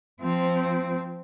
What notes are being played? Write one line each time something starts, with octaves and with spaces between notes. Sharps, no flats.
F3 C4